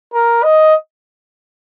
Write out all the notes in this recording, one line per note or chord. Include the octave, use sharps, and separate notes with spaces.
A#4
D#5